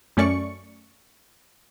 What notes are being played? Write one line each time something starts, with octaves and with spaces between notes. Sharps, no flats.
F#2 A3 C#4 D5 C#6 C#7